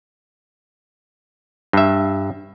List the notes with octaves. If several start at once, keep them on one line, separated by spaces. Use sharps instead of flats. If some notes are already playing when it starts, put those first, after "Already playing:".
G2 E5